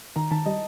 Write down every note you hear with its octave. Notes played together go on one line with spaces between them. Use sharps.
D#3 A#5
D#3 A5
G3 D#5